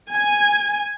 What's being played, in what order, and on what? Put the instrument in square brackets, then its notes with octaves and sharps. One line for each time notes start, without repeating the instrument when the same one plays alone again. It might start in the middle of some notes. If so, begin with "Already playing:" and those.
[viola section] G#5